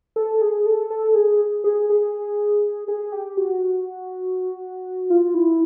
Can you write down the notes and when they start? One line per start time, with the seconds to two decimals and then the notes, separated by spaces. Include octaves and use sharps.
0.16 A4
0.42 G#4
0.66 A4
0.90 A4
1.15 G#4
1.64 G#4
1.90 G#4
2.88 G#4
3.12 G4
3.37 F#4
5.10 F4
5.34 E4